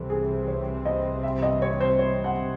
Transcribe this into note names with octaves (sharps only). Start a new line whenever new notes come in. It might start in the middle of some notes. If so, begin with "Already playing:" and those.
Already playing: C2 C3 E3 C4 A4
G#4
C#5
D#5
E5
D#5
C#5
C5
C#5
F#5